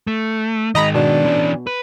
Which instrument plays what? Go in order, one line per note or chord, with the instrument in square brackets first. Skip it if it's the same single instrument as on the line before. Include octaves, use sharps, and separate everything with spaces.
[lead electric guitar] A3
[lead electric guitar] D#3 G#3 [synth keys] D#5 A#5 B5
[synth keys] B2 [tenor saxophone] D4
[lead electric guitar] E3 C#4
B4